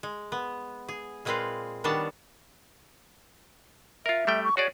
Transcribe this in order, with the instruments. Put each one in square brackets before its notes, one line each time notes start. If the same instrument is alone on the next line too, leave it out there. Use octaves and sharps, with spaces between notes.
[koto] G#3
B3
G#4
A#2 G#3 C4 G#4 B4 F5
D#3 G3 B3 D4 C#5 A5
[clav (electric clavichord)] F4 A#4 [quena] E5
[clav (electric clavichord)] G3 A3 G5
[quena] C#6
[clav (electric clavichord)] F#4 G#4 D5 [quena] C#5